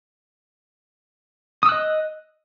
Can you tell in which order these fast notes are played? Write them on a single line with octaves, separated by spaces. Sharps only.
D#6 E6 F#6 D#5